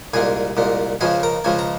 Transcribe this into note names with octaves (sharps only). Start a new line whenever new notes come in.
C2 A#2 G#3 G#4 G#5
C2 A#2 G#3
C#2 C#3 F3 G#3 G#4 G#5
A#4 A#5
C#2 C#3 F3 G#3 G#5
A#5